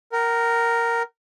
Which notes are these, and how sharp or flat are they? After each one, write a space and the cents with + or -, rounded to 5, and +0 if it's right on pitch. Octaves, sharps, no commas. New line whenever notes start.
A#4 +0 F#5 +45